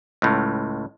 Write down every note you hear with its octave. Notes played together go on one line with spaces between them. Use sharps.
C#2 A2